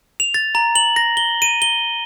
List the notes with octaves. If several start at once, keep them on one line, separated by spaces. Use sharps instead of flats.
F7
A6
A#5
F#7
A#6
G7
D#7
G7